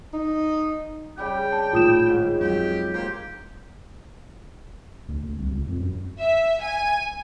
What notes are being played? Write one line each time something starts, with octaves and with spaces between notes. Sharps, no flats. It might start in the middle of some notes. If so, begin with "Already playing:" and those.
D#4
C#3 G3 G4 G5
A5
A#1 A2 D#3 F4 D#6 E7
G#2
F2 F#3 G4
A#3 G4 C5
D2
D2
C2
C#2
F2
F#2
E5
G#5